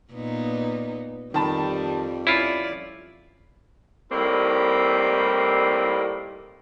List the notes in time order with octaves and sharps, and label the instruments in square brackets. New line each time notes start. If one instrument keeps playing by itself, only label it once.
[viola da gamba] A#2 B3 D#4
[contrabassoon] F2 [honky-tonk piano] D#3 A5 B5 [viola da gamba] G3
[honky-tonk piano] C#4 B5 [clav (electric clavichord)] E4 F4 [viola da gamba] D5
[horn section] A2 G3 A#3 C4 D#4